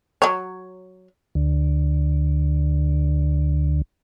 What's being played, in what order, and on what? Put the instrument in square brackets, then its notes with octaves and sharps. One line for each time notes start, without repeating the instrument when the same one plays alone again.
[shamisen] F#3 C#5
[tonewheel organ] D2 D3